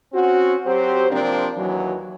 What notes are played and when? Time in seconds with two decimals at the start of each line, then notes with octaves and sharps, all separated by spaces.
0.14 C4 C#4 F#4
0.66 F#3 C4 G4 C5
1.11 C3 F3 A#3 C4 D4
1.57 D#2 E3 F#3